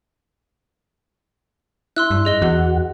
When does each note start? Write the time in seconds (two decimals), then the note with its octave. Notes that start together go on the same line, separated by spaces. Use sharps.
1.96 E4 C6 E6 F#6
2.11 G2
2.25 G#4 D#5 G7
2.42 E2 F#4 F#5